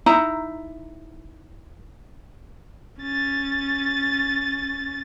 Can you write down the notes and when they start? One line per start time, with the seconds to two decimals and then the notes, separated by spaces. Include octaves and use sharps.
0.06 D#4 E4 A#5
3.00 C#4 A6